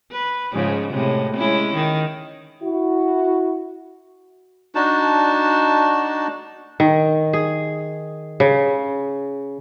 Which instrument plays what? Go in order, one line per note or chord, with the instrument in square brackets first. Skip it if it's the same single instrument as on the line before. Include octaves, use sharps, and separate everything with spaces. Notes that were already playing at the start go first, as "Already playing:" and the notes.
[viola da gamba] B4
G#2 C#3 F3
A2 C3 G#3
G#3 C#4 E4
D#3
[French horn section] E4 F#4
[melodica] D4 D#4 F#4 A5
[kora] D#3
G#4
C#3